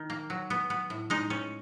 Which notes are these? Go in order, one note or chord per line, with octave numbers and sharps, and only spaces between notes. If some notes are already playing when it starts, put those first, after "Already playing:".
Already playing: D#3
A#3
F#3
B3
B3
A2
G#3 D#4
C#4